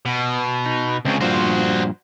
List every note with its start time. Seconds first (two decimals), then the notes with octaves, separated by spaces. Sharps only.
0.05 B2
0.66 D#4
1.05 C#2 C#3 C4 D4
1.21 G2 A#2 F3 F#4 C5